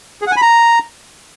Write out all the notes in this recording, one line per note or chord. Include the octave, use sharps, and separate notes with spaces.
G#4
F#5
G#5
B5
A#5